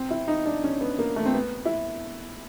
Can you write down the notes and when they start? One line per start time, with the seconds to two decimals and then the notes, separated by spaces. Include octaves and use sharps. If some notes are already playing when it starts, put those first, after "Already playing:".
Already playing: C4
0.10 E4
0.28 D#4
0.46 D4
0.64 C#4
0.81 B3
0.99 A#3
1.16 A3
1.26 C4
1.34 B3
1.65 E4